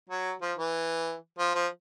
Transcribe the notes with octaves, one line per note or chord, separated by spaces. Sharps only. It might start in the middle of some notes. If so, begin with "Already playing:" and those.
F#3
F3
E3
F3
F3